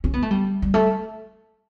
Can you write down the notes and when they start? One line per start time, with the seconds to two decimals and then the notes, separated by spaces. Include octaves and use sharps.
0.04 C#4
0.13 B3
0.22 A3
0.31 G3
0.62 G3
0.74 A3